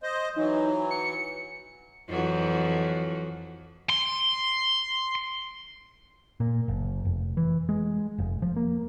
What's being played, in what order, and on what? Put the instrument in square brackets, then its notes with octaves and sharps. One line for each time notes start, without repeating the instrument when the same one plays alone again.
[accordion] C5 D#5
[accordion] E3 F#3 [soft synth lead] D#4
[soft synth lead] C#7
[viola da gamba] F2 E3 F#3
[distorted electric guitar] C6
[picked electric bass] A#2
F#1
F1
E3
G#3
F1
F3
A#3